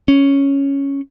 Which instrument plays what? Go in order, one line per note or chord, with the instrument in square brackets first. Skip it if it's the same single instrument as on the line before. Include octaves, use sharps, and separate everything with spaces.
[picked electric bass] C#4